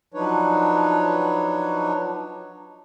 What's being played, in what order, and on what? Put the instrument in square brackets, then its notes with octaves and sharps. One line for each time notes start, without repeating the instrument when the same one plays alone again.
[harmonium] F3 F#3 D4 D#4 B4 C#5